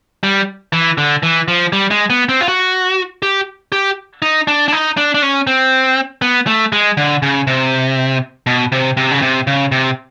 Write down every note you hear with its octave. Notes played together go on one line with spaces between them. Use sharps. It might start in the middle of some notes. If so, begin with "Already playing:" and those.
G3
E3
D3
E3
F3
G3
G#3
B3
C4
F4
F#4
G4
G4
D#4
D4
D4
D#4
D4
D4
C#4
C4
B3
A3
G#3
D3
C#3
C3
B2
C3
C3
C#3
C3
C#3
C3